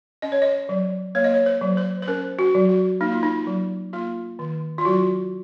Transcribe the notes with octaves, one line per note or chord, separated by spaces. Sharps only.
C#4 D#5
C#5
D#5
F#3
A#3 C#5
D#5
C#5
C5
F#3
C5
C5
C#4 A#4
F#4
F#3
F#4
A#3 D#4
F4
D#4
F#3
A#3 F4
D#3
F4
F#3 F#4